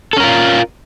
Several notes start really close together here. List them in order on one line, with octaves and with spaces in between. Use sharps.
A4 C#4 A#4 F4